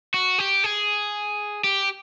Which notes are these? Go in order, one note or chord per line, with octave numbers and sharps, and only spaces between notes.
F#4
G4
G#4
G4